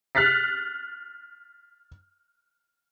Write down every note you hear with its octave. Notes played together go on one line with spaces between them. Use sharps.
F6 F#6 A6 B6 C7